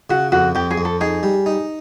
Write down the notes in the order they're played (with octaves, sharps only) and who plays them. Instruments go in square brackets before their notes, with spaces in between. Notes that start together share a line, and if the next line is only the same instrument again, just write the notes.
[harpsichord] C#3 [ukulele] F#4
[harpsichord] F2 [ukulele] F#4
[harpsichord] F2 [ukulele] G4
[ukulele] G#4
[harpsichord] F2
[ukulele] A4
[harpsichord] D#4 [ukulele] G#4
[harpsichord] G3
D#4